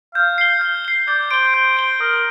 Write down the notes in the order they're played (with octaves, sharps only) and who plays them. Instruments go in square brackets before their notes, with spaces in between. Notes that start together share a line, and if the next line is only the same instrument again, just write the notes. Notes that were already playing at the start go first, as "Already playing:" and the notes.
[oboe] F5 [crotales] G6
[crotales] C7 G7
G6
C7 G7
[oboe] D5 [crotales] G6
[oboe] C5 [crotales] D7 G7
[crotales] G6
D7 G7
[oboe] A#4 [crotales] D#6